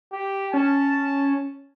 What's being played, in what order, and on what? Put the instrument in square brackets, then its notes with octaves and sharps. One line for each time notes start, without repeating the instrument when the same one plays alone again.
[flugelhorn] G4
[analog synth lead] C#4 [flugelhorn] A5